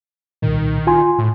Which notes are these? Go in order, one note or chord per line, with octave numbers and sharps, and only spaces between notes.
C2 A#2 D#3
F4 G#5 C6
A2